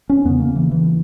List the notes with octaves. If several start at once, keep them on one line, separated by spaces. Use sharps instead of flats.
C#4
E2 C#3 B3
A#3
E3
E3